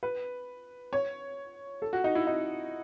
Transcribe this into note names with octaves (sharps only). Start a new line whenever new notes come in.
B4
C#5
A4
F#4
D#4
E4
D#4